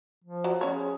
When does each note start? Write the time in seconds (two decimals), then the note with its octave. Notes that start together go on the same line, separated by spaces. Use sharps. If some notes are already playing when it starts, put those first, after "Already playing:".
0.24 F3
0.44 F#3
0.61 C#4 C#5
0.74 G#4